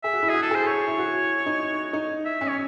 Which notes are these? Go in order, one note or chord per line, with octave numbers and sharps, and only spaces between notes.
G#4 E5
F#4
E4
F#4 G#4
A4
G#4 C5
C#5
E4
F#4
D#4
D#4
E5
C#4
C#5